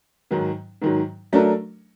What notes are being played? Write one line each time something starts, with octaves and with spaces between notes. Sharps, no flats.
G#2 D#3 F#3
G#2 D#3 F#3
F#3 A3 D4 F#4 A#4